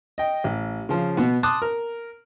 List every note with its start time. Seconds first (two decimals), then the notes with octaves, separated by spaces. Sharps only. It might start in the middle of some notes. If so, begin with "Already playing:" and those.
0.18 D#5 G5
0.44 A1
0.89 C#3 F3
1.17 B2 B3
1.43 A5 C6 D6 D#6 F#6
1.62 A#4